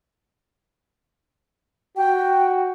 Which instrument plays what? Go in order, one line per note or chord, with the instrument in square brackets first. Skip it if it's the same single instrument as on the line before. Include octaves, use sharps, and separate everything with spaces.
[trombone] F#4 [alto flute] G5